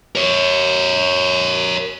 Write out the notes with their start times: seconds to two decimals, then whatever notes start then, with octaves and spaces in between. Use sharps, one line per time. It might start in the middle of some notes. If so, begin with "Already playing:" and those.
0.16 A#4 C#5